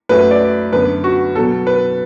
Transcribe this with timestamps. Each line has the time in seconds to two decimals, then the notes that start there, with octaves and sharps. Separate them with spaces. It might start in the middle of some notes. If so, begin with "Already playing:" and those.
0.09 F#2 F#3 A3 B4
0.31 D5
0.73 F#2 D3 B3 B4
1.04 F#4
1.35 B2 F#3 B3 A4
1.67 B4